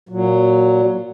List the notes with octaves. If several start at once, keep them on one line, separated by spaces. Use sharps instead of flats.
A#2 F#3